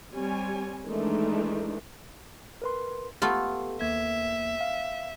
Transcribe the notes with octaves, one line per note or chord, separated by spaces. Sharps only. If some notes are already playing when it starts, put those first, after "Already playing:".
G3 C4 C#5 G#5
D#3 E3 G#3 A3 D4 D#4
A#4 B4 C6
A3 B3 F4 G4
D#2 A#3 E5 G#6
F5